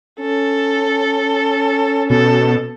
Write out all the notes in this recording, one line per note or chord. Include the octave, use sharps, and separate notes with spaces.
C#4 A4
B2 A4